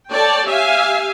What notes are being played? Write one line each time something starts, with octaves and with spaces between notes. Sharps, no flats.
A4 C#5 D5 G5 A5
G4 E5 F5 G#5